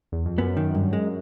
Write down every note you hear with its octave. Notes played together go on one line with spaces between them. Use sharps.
E2
F2
F#2 B3
D#3
G2
G#3